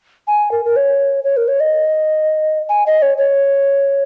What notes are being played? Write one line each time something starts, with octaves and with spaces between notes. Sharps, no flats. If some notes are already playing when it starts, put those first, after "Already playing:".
G#5
A#4
A#4
C#5
C#5
A#4
C#5
D#5
G#5
D#5
C#5
C#5